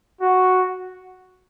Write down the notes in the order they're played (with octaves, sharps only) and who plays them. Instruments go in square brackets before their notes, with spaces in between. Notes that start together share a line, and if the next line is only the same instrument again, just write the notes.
[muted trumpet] F#4